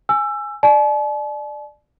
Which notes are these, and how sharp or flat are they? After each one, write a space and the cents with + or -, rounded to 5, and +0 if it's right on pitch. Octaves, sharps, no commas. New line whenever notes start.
G#5 +0 E6 +20
D5 +20 A5 -45